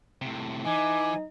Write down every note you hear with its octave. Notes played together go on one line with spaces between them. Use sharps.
A2 C3
E3 D#4 G#5 D6